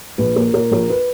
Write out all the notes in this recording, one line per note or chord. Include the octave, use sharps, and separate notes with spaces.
A#1 B4
A#2 A#4
A#2 A#4
A#1 A#4
B4